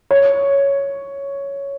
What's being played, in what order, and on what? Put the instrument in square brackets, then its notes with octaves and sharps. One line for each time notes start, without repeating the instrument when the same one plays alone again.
[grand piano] C#5